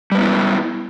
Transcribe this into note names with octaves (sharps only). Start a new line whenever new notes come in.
G3 B3 E4 B4